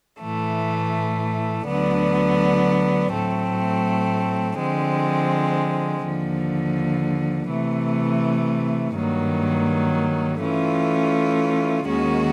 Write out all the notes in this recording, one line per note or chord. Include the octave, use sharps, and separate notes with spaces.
A2 E3 A3
D2 D3 F#3 B3 D4
A2 F#3 A3 C4
D3 F3 G#3 C4
D#2 D3 F3
C3 E3 A3
G2 D#3 F#3 A#3
E3 A3 C#4 F4
D#2 D#3 G#3 C#4 F#4